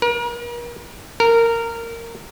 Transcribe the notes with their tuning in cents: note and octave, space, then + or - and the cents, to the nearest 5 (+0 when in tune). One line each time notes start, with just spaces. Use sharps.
A#4 +40
A#4 -15